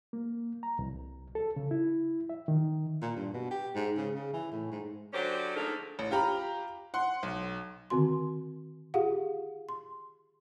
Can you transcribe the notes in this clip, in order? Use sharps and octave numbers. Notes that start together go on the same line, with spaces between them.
A#3
A#5
C2
A4
C#3
E4
E5
D#3
A#2
G2
B2
G4
G#2
C#3
C#3
E3
A2
G#2
D3 F#3 C#4 G4 C5 D5
D3 F3 A3 A#3 D#4 G#4
A1
F4 G4 A#5 B5
F#5 C6
B1
D3 D#3 C4 F#4 C6
F4 G4 G#4 F5 F#5
C6